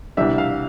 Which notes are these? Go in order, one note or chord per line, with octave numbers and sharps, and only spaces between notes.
C2 B2 G3 D4 E5
F5